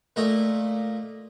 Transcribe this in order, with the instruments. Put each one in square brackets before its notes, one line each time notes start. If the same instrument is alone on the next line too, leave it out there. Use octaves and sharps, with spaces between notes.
[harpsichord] A#2 A3 A#3 D#5 A#5